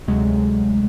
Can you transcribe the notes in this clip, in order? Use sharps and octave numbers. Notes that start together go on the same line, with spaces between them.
D2 C3 F#3 G#3 A3